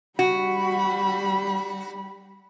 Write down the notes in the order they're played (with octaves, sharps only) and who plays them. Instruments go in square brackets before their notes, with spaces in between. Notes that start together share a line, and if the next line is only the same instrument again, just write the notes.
[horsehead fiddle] G3 B5 [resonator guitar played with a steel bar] F#4